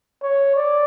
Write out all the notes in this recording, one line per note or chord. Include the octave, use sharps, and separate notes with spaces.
C#5
D5